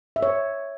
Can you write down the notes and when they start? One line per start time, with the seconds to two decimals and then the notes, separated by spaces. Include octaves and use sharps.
0.16 E5
0.23 C#5